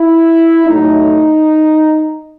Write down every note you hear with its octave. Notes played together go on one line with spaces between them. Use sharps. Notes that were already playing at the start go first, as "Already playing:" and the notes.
Already playing: E4
A2 F#3 A3 D#4